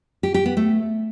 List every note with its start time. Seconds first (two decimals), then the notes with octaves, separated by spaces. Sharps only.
0.23 G4
0.34 G4
0.46 B3
0.57 A3